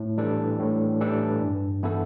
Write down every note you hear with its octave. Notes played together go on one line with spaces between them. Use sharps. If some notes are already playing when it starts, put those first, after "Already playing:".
Already playing: A2
E3 G3 D4 A4
A2
E3 G3 D4 A4
G2
E3 B3 E4 A4